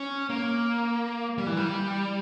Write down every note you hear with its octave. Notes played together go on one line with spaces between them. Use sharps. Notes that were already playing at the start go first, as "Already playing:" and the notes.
Already playing: C#4
A#3
G3
E3
G3